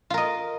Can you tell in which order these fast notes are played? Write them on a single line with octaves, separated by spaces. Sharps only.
F4 A#4 D#5